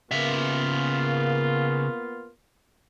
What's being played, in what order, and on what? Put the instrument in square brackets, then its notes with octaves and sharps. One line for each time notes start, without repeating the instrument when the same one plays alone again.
[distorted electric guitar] C#3 E5 [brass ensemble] A#3 B3 F4